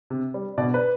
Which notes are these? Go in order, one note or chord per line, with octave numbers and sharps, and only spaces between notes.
C3
G3
B2 D5
B4